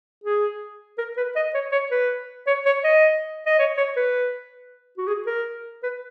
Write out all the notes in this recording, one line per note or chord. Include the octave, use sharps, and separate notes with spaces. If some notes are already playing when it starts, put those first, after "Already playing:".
G#4
A#4
B4
D#5
C#5
C#5
B4
C#5
C#5
D#5
D#5
C#5
C#5
B4
F#4
G#4
A#4
B4